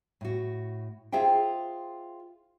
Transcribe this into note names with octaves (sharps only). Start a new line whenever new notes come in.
A2 F#4
F4 G#4 C5 E5 G5